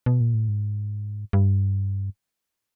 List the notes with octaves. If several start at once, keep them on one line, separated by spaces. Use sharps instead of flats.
B2
A#2
A2
G#2
G2